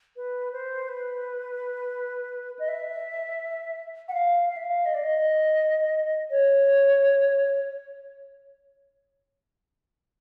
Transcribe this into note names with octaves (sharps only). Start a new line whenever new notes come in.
B4
C5
B4
D#5
E5
F#5
F5
F5
E5
F5
D#5
D5
D#5
C#5